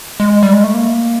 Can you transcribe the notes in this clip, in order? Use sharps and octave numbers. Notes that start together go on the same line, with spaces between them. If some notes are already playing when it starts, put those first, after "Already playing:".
G#3
G3
G#3
A3
A#3